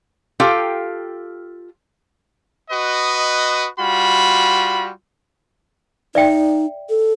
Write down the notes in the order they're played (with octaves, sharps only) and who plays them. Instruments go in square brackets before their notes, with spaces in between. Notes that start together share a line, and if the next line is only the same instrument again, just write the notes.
[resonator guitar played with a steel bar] F4 G4 A4 F5 G5
[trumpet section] F#4 B4 D#5
G3 F4 F#4 B5
[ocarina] D#4 [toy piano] D5 E5 G5
[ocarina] A4